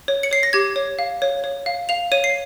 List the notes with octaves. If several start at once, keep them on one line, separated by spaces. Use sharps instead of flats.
C#5
C#7
C#5 C7
A#6
G4 G#6
C#5
F5
C#5
C#5
F5
F5 F7
C#5 D#7
C7